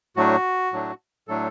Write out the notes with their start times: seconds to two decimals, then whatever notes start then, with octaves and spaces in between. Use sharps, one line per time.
0.16 A2 F#3 A3 D4 F#4
0.73 A2 F#3 A3 D4
1.28 A2 F#3 A3 D4 A4